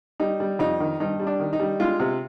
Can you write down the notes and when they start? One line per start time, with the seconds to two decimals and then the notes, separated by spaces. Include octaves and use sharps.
0.20 G3 D#4
0.40 G3
0.59 F2 D#4
0.80 D#3
1.00 G2 D#4
1.20 G3
1.27 D4
1.40 D#3
1.53 D#4
1.60 G3
1.79 G#3 F4
2.00 C3